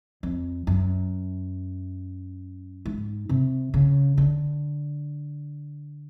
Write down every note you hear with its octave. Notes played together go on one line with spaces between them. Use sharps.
F2
F#2
G#2
C3
C#3
D3